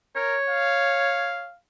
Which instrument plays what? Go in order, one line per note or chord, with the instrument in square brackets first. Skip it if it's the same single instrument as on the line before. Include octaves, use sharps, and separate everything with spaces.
[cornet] A#4 [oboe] C#5
[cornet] F5